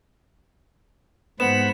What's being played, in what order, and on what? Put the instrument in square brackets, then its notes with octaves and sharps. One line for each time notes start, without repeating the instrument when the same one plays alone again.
[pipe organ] G#2 B5 [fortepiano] B3 [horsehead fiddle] C5 F#5 [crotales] E7